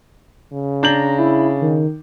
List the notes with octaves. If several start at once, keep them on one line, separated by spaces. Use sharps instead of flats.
C#3
D4 A#5 G6 F#7
E4
D#3